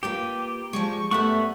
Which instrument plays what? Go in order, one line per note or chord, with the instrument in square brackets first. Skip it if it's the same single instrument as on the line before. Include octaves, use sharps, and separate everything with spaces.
[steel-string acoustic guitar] A#3 F4 B4 [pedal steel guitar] G4
[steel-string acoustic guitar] F3 G3 G#3 [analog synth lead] C#6
[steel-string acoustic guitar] F#2 G3 B3 [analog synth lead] A3 [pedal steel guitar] E5 F#5 C#6